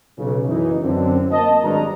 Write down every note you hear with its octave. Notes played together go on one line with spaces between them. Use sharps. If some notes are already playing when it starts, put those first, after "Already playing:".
B1 C#3
F#1 E3 D#4 E4
F#2 D3 C4
A#3 D#5 A5
G#1 G2 A#5